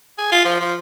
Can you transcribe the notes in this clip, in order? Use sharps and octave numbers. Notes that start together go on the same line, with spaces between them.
G#4
F4
F3
F3